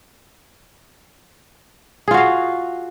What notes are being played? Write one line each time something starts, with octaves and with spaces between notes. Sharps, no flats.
F4 F#4 G#4 F5